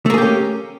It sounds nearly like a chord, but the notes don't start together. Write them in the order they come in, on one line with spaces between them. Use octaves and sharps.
A3 A#3 G#4 G4 C#4